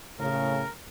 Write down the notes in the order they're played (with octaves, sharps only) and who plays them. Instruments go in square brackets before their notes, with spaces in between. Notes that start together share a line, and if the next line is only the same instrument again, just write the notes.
[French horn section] A2 C#3 [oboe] A#4